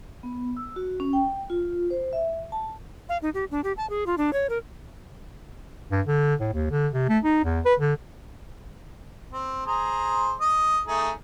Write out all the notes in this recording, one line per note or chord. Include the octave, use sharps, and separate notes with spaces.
B3
E6
F#4
C#4
G5
F4
C5
E5
A5
F5
D#4
G4
D4
G4
A5
G#4
F4
D4
C#5
A#4
G2
D3
A2
D#2
D3
C3
A3
D#4
E2
B4
D3
C4
G#4 C5 A#5
D#5
A3 D#4 G#4